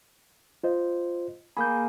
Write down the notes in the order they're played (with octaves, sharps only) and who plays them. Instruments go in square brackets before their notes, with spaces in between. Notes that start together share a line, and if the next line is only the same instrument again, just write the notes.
[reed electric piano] F4 C5 D#5
[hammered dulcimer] A#3 G#4 [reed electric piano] B5 G6